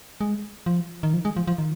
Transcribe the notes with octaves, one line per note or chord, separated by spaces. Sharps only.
G#3
F3
D#3
F3
G#3
F3
F3
D#3